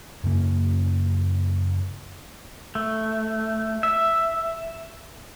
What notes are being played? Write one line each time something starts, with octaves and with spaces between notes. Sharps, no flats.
F#2 C#3 A#3
A3
E5